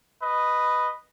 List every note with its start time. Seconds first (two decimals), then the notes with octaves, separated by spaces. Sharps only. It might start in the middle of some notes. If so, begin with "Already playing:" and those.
0.21 B4 D#5